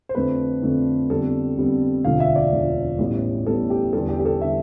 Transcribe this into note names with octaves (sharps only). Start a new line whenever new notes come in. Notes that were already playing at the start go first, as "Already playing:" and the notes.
C5
F2 D3 A3 B4
F2 D3 A3
F2 D3 G3 B3 A4
F2 D3 G3 B3
E1 D2 D3 F3 F5
E5
D5
E1 D2 D3 F3
A1 A2 G3 B3
A1 A2 G3 B3 A4
G4
E2 D3 G3 A4
G4
G4
A4
D3 G3 E5